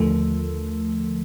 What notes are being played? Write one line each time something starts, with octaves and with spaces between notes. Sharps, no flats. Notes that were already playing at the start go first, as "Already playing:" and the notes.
Already playing: D#2 D3 F3 A3